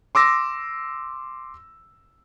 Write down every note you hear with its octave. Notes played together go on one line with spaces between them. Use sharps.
C6 D6 E6 A#6